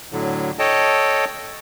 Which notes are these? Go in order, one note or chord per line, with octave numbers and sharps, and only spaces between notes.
A2 D3 F#3
A4 C#5 D#5 G5 A5